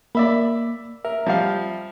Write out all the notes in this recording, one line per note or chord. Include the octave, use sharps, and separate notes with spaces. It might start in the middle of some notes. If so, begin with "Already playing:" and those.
A#3 D5 E5 B5
A#4 E5
F3 G3 F5